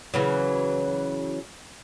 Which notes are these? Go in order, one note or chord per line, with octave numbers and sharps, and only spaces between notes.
C#3 E3 F#3